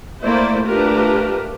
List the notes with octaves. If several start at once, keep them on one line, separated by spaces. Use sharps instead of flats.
A3 A#3 E4 C5 D5
A3 D4 F4 G4 A#4 B4